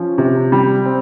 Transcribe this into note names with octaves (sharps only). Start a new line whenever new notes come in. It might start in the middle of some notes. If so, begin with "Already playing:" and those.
Already playing: F3 C#4
C3
G3
C4